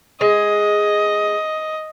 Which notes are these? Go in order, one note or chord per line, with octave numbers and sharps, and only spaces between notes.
G#3 D#5